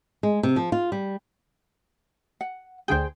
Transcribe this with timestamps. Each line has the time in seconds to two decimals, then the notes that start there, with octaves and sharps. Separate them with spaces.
0.23 G#3
0.43 C3
0.56 F3
0.72 F4
0.92 G3
2.41 F#5
2.88 D2 D3 G#4 C5 G5